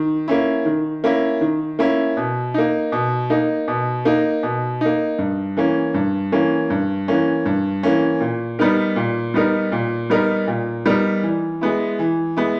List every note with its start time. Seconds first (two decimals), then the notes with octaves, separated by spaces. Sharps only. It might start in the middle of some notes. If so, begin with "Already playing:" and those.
Already playing: D#3
0.28 A#3 C#4 E4
0.65 D#3
1.04 A#3 C#4 E4
1.41 D#3
1.79 A#3 C#4 E4
2.17 B2
2.54 A#3 D#4
2.92 B2
3.30 A#3 D#4
3.68 B2
4.05 A#3 D#4
4.43 B2
4.81 A#3 D#4
5.19 G2
5.57 E3 A#3 C#4
5.94 G2
6.32 E3 A#3 C#4
6.70 G2
7.08 E3 A#3 C#4
7.46 G2
7.83 E3 A#3 C#4
8.21 A#2
8.59 G3 B3 D#4 A#4
8.96 A#2
9.34 G3 B3 D#4 A#4
9.72 A#2
10.10 G3 B3 D#4 A#4
10.47 A#2
10.86 G3 B3 D#4 A#4
11.23 E3
11.61 G#3 B3 E4
11.99 E3
12.37 G#3 B3 E4